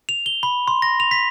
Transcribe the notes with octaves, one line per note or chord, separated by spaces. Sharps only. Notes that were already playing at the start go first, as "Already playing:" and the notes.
F7
G7
B5
C6
A#6
F7
B6